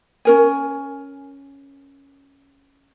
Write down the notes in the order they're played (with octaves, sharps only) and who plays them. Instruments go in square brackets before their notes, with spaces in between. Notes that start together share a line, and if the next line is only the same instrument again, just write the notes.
[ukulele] C#4 A#4 G#5